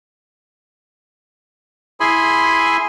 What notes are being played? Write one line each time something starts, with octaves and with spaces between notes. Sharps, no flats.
E4 G#4 G#5 B5 C6